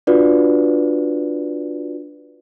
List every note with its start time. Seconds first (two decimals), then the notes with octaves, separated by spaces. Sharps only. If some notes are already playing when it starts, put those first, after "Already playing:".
0.07 D4 F4 F#4 B4 D5